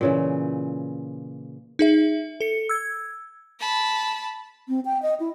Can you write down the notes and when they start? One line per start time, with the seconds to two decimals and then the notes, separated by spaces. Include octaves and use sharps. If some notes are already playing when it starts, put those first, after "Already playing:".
0.01 A#2 C#3 E3
1.79 D#4 G#4 E5
2.41 A4 C#7
2.69 E6 G#6
3.60 A5 B5
4.68 C4
4.85 G5
5.02 D#5
5.20 E4